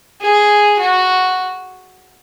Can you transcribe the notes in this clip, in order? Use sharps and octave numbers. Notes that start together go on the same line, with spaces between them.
G#4
F#4